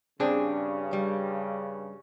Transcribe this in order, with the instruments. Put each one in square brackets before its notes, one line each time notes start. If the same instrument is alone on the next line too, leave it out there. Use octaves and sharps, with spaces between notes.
[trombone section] G2 C#3 [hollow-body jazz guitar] C4 D4 G#4
[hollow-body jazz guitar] G3